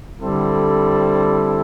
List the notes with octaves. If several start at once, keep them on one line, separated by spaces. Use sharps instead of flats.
D3 G3 C4 E4 A4